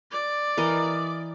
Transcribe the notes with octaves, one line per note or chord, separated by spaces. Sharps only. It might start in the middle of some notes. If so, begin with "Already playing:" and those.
D5
E3 A#4 D#5